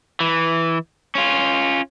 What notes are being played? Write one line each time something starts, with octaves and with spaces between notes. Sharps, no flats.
E3
C#4 F4